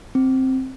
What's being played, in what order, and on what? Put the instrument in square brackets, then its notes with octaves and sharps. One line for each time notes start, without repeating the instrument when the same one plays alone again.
[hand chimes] C4